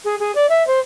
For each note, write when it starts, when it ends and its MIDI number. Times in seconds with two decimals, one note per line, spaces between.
0.04 0.15 68
0.19 0.32 68
0.35 0.46 74
0.49 0.65 76
0.67 0.79 72